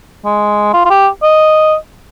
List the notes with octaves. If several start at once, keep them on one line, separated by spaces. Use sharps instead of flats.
G#3
F4
F4
G4
D#5